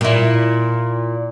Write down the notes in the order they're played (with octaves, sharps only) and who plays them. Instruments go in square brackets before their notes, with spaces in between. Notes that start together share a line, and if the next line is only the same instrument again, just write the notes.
[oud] A#2 E4